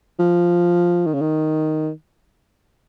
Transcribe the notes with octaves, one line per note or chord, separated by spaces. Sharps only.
F3
D#3
C#3
D#3